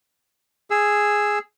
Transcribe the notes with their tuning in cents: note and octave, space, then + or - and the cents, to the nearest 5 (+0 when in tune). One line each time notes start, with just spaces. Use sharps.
G#4 +0 E6 +0